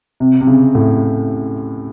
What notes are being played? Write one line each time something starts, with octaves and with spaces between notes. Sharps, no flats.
C3
C3
C#3
A2